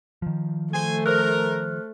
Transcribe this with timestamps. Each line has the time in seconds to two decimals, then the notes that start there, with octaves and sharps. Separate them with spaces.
0.22 D#3 F3
0.73 A3 C5 G#5
1.06 A#4 C5 F6 F#6